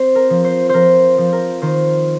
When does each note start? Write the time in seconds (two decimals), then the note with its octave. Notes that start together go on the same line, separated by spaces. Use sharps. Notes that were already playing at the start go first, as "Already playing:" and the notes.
Already playing: C4 C5
0.15 A#4
0.30 F3
0.44 C5
0.69 F3 A#4 C5
1.18 F3
1.33 A#4
1.62 D#3 C5